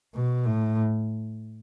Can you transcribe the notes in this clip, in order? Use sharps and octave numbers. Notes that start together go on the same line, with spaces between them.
B2
A2